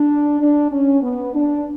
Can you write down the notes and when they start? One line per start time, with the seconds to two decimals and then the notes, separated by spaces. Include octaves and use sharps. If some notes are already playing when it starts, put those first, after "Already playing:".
Already playing: D4
0.41 D4
0.71 C#4
1.02 B3
1.33 D4